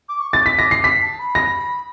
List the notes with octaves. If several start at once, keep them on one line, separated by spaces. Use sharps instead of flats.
D6
C#6
D6 A6
B6
A#6
C7
B6
A5
B5
A#6